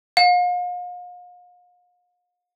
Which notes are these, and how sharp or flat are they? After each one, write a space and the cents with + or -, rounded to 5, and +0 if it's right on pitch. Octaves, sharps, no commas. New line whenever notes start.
F5 +40